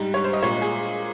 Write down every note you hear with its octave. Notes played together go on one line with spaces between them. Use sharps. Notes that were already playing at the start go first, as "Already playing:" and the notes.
Already playing: G#2 G3
C#5
C5
D#5
A#2 G#3 C#5
G#4